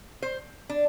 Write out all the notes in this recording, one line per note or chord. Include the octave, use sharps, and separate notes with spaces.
C5
D4